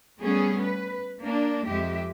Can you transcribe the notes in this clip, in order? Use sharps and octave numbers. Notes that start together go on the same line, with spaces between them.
G3 A3 B3 C#4 G#4
B4
A#3 D4
F2 G#3 G4 E5